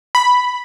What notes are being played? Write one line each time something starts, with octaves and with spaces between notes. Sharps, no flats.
B5